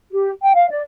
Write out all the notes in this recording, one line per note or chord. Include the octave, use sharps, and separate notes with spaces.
G4
G5
F5
D5